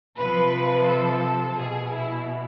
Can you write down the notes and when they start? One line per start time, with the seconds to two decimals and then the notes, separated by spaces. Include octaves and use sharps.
0.17 C3 F3 B4
0.87 A4
1.56 B2 G#4
1.91 E4